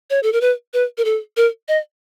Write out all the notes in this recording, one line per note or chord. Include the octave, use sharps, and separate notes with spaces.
C#5
A4
A#4
B4
B4
A#4
A4
A#4
D#5